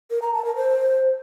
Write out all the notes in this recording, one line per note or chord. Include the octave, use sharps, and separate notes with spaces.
A#4
A#5
A5
A#4
C5